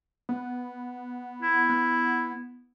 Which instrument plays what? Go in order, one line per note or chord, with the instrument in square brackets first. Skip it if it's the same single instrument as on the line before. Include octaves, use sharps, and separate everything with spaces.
[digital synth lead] B3
[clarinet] E4
[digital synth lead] B3